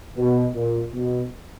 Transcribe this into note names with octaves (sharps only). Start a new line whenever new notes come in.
B2
A#2
B2